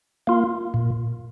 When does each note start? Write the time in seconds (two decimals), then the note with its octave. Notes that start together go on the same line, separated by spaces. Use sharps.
0.27 A#3 F4
0.74 A#2